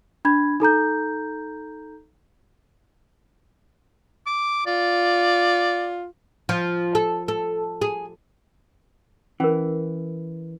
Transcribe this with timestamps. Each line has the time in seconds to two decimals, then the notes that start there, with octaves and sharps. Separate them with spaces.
0.25 D4 B5 G#6
0.60 D#4 A4 A#5 G6
4.27 D6
4.67 F4 D5
6.49 F3
6.95 A4
7.28 A4
7.82 G#4
9.40 E3 C#4 A#4